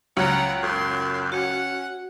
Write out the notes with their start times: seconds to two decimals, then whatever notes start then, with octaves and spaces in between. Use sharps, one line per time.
0.17 C#2 F#3 C#4 F#5 A#5
0.63 F#2 C6
1.32 C#4 F#4 F#5